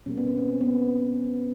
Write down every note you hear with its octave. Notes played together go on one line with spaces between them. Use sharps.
B2 G3 A#3 C#4
B3
C4
C#4
C4
B3